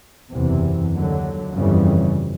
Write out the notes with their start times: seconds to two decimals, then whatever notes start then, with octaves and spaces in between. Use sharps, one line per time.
0.32 F#1 E2 C3 E3
0.94 D#2 D3 F#3
1.55 G1 F2 C#3 E3 G3